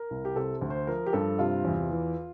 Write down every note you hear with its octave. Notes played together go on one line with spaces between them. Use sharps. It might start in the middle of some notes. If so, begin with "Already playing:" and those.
Already playing: A#4
C2
G4
C3 A4
D2
C5
F3 A#4
G4
G2 A4
C3 F4
E2
E3